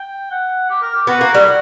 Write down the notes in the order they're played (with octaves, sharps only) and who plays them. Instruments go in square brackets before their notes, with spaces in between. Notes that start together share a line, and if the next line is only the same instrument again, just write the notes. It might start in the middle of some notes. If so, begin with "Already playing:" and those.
Already playing: [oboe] G5
F#5
G4
A#4
G4
[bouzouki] B3 [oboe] F#4
[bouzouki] A#3
G3
[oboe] E4
F#4